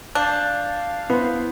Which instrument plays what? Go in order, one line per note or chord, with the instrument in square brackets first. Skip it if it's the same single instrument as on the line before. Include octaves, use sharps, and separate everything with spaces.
[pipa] D4 [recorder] F5 [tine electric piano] A5 G6
[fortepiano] B3 [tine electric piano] E4 C5